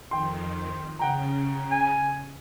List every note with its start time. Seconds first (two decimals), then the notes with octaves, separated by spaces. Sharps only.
0.11 F2 D#3 G5 C6
0.99 C#3 F#5 G5 A#5
1.71 G#5